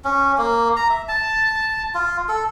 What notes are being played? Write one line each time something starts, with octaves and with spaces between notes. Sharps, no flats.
C#4
A#3
A#5
E5
A5
F4
A4